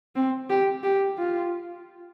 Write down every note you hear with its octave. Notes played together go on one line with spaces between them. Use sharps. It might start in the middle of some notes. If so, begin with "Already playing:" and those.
C4
G4
G4
F4